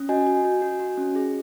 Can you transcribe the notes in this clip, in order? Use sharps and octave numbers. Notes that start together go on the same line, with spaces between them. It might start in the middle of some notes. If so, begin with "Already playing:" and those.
Already playing: C#4
F#4 D#5 G#5
F#4
F#4
F#4
F#4
C#4
G#4